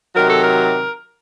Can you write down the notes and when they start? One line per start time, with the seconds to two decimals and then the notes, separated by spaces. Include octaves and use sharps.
0.15 C3 D#3 F#3 A#4
0.28 A4
0.44 A#4